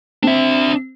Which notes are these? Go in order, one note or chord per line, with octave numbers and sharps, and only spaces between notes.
C4 D4 E5